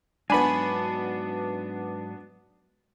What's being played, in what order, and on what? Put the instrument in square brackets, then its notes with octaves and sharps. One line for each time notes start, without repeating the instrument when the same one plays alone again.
[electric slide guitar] G#2 F#3 F#4 [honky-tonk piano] B3 D4 [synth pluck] G#5 B5